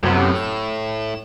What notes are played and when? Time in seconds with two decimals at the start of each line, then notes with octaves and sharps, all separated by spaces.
0.03 F#2 A2 C3 B3
0.35 E7